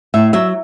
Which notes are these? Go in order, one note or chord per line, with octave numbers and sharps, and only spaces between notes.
A2 E5
F#3 E5